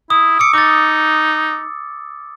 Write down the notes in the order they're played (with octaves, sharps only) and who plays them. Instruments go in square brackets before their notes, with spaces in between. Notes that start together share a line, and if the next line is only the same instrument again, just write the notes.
[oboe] E4 [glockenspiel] D#6
[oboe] D6 [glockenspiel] E6 C#7
[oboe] D#4 [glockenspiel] D6 A6